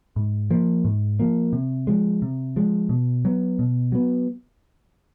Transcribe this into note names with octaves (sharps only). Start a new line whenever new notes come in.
G#2
F3 A#3
G#2
F3 A#3
C3
F3 G#3
C3
F3 G#3
B2
F#3 B3
B2
F#3 B3